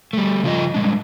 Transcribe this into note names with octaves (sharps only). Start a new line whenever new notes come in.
G3 A3
C#3 F3 D#5
G3 G#3 D4